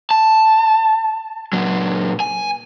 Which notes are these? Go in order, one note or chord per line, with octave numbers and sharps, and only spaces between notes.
A5
A#2 F#3
G#5